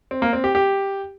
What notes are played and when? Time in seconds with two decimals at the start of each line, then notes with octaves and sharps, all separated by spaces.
0.11 C4
0.22 A#3
0.33 C4
0.44 G4
0.55 G4